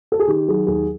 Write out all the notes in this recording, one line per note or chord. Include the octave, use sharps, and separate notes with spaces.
A4
G#4
D#3 G4
F#3 G#4
D#2 G#4